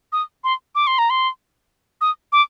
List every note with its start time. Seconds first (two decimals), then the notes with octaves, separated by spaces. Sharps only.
0.12 D#6
0.44 C6
0.75 D6
0.87 C6
0.98 A#5
1.10 C6
2.01 D#6
2.32 D6